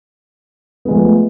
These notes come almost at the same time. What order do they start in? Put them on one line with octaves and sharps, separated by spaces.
B3 G#3 F3 A3